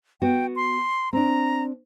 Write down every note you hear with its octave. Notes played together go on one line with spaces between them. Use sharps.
B3 F#4 G5
C6
C4 D4 A#5